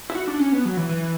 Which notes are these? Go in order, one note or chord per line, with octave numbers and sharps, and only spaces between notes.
E4
F#4
D4
C#4
B3
F#3
E3
E3